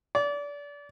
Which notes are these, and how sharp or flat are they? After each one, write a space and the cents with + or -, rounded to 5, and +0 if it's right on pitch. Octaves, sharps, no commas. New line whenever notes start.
D5 -30